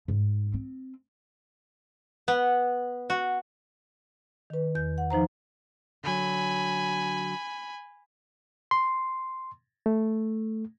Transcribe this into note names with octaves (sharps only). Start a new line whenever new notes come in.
G#2
C4
B3
F#4
D#3 B4
E2 G6
F#5
F3 D#4 C5 A#5
D3 F#3 G#5 B5
C6
A3